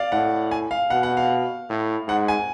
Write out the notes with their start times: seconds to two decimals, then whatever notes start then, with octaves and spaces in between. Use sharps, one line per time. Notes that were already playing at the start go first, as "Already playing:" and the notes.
Already playing: D5 F5
0.12 A2 F#5
0.51 G#5
0.71 F5
0.90 B2 F#5
1.03 F#5
1.17 F5
1.70 A2
2.08 G#2 F#5
2.28 G#5